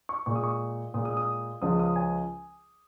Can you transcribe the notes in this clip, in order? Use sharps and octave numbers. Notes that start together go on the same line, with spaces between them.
C#6
A#2 G#3 C#6
D#6
C#6
A#2 G#3 D#6
D#6
D#6
C#2 C#3 F3 G#3 D#6
D#6
G#5